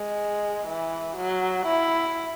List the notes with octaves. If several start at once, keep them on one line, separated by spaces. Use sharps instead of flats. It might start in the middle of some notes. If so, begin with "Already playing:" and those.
Already playing: G#3
E3
F#3
E4